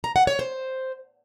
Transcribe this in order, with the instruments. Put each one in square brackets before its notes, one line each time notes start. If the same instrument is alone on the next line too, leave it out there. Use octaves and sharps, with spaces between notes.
[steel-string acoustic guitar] A#5
F#5
C#5
C5